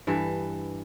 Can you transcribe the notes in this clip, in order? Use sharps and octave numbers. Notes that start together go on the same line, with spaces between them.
G2 E3 A4